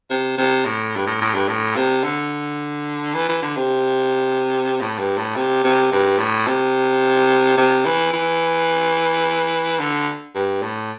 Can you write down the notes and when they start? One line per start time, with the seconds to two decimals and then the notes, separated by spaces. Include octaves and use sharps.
0.10 C3
0.38 C3
0.66 A2
0.96 G2
1.07 A2
1.21 A2
1.35 G2
1.48 A2
1.76 C3
2.04 D3
3.14 E3
3.29 E3
3.42 D3
3.57 C3
4.81 A2
4.99 G2
5.18 A2
5.36 C3
5.64 C3
5.92 G2
6.19 A2
6.47 C3
7.58 C3
7.86 E3
8.13 E3
9.79 D3
10.35 G2
10.63 A2